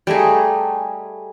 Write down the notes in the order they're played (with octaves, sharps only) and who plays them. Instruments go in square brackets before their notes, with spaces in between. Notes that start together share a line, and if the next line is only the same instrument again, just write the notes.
[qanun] G3 A3 D#4 G#4